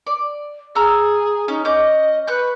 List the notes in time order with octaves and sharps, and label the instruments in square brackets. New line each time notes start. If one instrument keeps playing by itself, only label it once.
[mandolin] D5
[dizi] G#4 [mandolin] A#5 E6 F6
[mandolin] C#4 [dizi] D#4
[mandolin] C#4 D6 G6 [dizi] D#5
[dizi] B4 [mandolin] C#6 F#6 G6